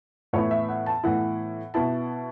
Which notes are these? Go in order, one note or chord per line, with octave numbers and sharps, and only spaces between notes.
A2 E3 B3 E4 C#5
E5
F#5
A5
A2 E3 B3 E4 F#5
B2 B3 E4 A5